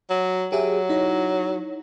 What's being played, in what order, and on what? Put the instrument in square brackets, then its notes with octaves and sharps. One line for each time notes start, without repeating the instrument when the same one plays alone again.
[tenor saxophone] F#3
[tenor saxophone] F#3 [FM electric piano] G4 G#4 E5
[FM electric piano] D#4 E4 C#5